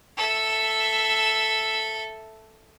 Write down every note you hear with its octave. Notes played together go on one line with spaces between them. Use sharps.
A4 E5